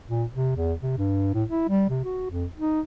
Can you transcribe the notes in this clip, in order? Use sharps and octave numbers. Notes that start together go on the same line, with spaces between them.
A#2
C3
E2
C3
G2
A2
E4
G3
C3
F#4
F2
D#4